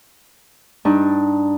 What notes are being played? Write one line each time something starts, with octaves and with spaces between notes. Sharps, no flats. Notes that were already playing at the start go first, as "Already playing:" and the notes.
G2 D4 D#4